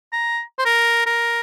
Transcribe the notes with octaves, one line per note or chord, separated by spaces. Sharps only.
A#5
C5
A#4
A#4